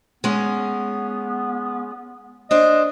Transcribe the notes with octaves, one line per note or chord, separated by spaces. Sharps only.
G#3 B3 C#4
D4 C5 D#5